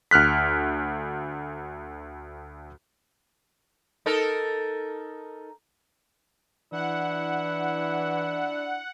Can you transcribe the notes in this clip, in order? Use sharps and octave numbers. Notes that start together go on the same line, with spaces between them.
D2 F6 F#6 B6
D#4 A4 A#4
E3 D4 E4 F#5